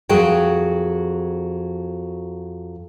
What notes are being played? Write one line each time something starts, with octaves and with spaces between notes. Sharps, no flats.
F2 F#3 F#4 G#4 A#4 G5